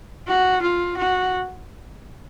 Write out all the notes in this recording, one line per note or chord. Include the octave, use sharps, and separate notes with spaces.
F#4
F4
F#4